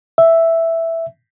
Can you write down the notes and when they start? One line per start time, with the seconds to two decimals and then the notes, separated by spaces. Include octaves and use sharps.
0.18 E5